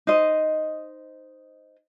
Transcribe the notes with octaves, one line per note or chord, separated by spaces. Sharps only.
D#4 C5 D#5